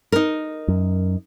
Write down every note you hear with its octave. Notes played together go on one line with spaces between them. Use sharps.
D#4 A#4
F#2